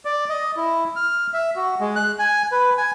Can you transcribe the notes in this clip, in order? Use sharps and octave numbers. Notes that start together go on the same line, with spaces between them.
D5
D#5
E4
F6
E5
F#4
G#3
F#6
G#5
B4
G#5